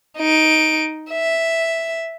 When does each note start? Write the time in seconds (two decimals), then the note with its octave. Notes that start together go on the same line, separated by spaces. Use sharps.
0.18 D#4 D7
1.11 E5